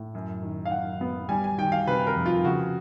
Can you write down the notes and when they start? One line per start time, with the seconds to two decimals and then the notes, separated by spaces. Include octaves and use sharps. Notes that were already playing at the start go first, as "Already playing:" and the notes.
Already playing: A2
0.15 F#2
0.42 D#3
0.65 F5
0.71 F#2 F#5
1.01 B3
1.29 G3 G#5
1.44 G#5
1.58 D#3 G5
1.72 F5
1.87 C3 B4
2.07 A#4
2.16 F2
2.26 F4
2.44 C#3 F#4